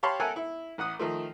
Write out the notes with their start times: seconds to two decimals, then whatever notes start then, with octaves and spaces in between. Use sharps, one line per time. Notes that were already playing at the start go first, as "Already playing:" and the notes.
0.03 G4 C#5 F5 A5 B5 C6
0.20 A4 A#4 E5 F#5 G#5
0.36 E4
0.78 A1 F#5 D#6
0.99 D#3 F3 A3